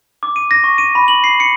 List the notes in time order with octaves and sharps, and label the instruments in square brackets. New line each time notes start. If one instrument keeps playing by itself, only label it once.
[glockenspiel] D6
D#7
A#6
C#6
D#7
B5
F#7
C7
C#7